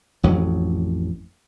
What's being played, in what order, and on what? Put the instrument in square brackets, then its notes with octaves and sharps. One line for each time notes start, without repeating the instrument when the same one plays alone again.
[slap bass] A1 F2 F#3